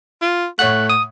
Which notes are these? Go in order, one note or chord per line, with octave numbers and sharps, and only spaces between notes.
F4
A2 A3 C#5 F#5 F#6
D#6